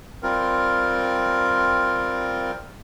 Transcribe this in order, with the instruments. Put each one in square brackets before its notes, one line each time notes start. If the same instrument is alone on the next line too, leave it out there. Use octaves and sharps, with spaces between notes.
[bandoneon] G3 C4 F4 A#4